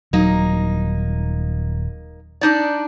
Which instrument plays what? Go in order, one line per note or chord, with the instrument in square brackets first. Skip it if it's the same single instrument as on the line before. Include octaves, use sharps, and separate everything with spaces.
[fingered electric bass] D#1 F#3 [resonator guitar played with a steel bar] A#3 D#4
[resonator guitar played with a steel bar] D4 D#4 D5